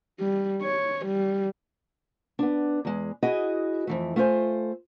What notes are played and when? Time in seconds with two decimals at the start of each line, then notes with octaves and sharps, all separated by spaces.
0.20 G3
0.62 C#5
1.06 G3
2.39 B3 D4
2.85 E2 G#3
3.23 E4 F#4 G#4 D#5
3.87 F2 E3 A3
4.16 A3 F4 A#4 C5 G#5